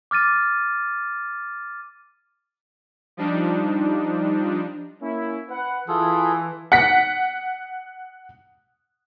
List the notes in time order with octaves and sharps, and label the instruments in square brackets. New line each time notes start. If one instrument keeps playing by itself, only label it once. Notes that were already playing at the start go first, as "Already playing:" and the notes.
[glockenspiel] D6 F6 A6 D#7
[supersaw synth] F3 G3 D4 D#4
[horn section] A#3 C#4 E4
B4 F#5
[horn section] E3 [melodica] F4 G#4 A4
[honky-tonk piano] F#5 B6